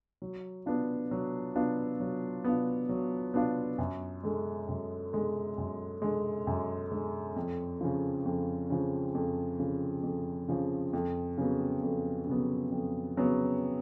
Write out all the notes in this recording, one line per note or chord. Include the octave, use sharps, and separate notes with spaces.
F#3
B3 D4 F4
F#3
B3 D4 F4
F#3
B3 D4 F4
F#3
B3 D4 F4
F#2
D3 G#3
F#2
D3 G#3
F#2
D3 G#3
F#2
D3 G#3
F2
C#3 F3
F2
C#3 F3
F2
C#3 F3
F2
C#3 F3
F2
C#3 F#3 B3
F2
C#3 F#3 B3
F2
C#3 F#3 B3